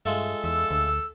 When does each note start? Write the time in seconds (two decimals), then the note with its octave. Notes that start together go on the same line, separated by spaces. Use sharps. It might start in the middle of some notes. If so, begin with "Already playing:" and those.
0.06 G2 G#3 F4 A4 E5
0.44 E2 E6
0.71 D2